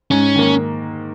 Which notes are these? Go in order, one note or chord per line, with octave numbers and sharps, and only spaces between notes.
G#2 C#4
D#3 A#3